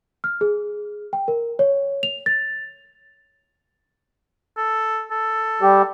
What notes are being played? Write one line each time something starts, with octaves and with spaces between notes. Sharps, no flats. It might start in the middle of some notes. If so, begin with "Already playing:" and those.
F6
G#4
G5
A#4
C#5
F7
A6
A4
A4
G3 G4